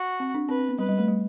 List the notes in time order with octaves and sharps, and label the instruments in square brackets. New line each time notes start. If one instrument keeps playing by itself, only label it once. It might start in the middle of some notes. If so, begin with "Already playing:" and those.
Already playing: [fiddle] F#4
[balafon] C4
D4
[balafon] C4 [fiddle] B4
[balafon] C4
B3
[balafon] G3 [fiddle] B4
[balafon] G3
A3
G3